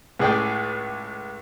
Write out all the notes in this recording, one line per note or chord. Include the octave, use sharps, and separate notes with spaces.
C#2 A2 G#4 D5 G5